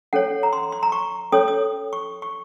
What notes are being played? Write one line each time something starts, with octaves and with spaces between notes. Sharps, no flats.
C#4 A4 C#5 F#5
A#5
C6
C6
A#5
C#6
C#4 A4 C#5 D#6
D#6
C#6
C#6